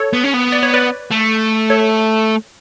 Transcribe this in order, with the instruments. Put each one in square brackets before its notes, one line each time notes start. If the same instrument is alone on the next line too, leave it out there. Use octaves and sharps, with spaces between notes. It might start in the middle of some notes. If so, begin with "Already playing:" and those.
Already playing: [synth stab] A4 C#5
[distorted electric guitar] B3
C#4
B3
[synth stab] D5
C#5
B4 D5
[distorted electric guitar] A3
[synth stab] A4 C#5